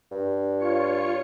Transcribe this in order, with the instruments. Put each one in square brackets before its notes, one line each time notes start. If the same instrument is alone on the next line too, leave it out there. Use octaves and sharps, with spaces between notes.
[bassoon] G2
[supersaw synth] F4 C#5 C#7